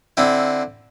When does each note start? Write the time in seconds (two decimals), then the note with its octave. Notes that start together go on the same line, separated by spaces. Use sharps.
0.17 D3 C4 E4